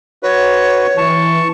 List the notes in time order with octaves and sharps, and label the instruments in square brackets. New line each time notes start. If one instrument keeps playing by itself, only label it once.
[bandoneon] F#4 B4 [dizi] C#5
[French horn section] E3 [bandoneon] A5 C#6